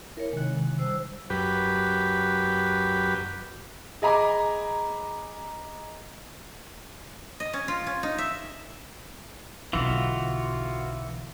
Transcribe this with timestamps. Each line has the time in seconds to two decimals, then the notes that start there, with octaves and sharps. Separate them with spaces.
0.17 E4 A#4 C#5
0.33 C3 D#3 G#3 F#6
0.78 G3 C5 E6
1.30 F#2 G4 B4
4.02 G#4 D#5 G#5 A#5 B5 D6
7.40 D#5
7.53 C#4
7.68 F4
7.87 C#4
8.03 D#4
8.18 E5
9.73 B1 D3 E3 F4 F#4